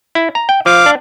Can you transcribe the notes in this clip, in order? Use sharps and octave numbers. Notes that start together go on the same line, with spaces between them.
E4
A#5
G5
F3 F5 D6
D4